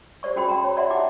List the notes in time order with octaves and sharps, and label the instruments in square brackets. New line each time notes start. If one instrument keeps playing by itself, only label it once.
[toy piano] G4 C5 D5 C#6
C#4 F#4 G#4 G5 B5 C6
G5 A#5
C#5
D5 E5 F#5 A#5 C6
D#4 E4 G4 F#5 G5 D6